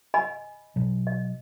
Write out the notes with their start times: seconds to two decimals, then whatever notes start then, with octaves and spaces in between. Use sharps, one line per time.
0.14 D#5 G#5 B5
0.76 B2 F#3
1.07 D#5